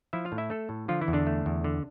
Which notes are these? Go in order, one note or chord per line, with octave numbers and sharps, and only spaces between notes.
F3 E4 E5
F4 F5
A2
E4 E5
A3 A4
A2
D3 F3 F4
E3 E4
E2
D3 D4
A3
E2
D3